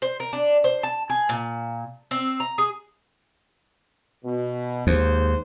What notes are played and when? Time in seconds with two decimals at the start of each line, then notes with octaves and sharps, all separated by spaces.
0.02 C5
0.20 A#4
0.33 D4
0.64 C5
0.83 A5
1.10 G#4
1.29 A#2
2.11 C4
2.40 A#5
2.58 G#4
4.25 B2
4.87 D#2 G#2 C5